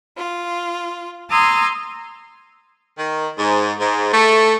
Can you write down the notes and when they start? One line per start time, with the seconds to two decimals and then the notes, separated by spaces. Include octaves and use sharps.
0.17 F4
1.30 A#5 C6 D#6 E6 G#6 A6
2.99 D#3
3.39 G#2
3.80 G#2
4.13 A3